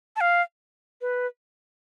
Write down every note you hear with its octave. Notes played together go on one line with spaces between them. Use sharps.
A5
F5
B4